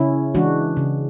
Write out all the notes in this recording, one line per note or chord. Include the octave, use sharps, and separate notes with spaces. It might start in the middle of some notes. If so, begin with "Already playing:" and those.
Already playing: C#3 C#4 E4
E3 G#3 D4 F#4
C#3